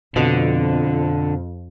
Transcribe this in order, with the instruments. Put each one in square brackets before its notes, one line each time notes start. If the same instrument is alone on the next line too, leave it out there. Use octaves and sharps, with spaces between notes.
[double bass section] F2 [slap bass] B2 [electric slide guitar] D3